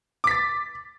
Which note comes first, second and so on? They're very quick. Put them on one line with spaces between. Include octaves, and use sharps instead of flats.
D6 B6 A6